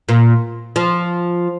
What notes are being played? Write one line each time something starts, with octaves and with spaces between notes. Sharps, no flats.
A#2
F3